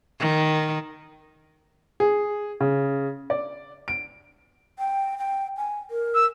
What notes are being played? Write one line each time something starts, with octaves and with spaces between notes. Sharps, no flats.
D#3
G#4
C#3
D5
D7
G5
G5
G#5
A#4
E6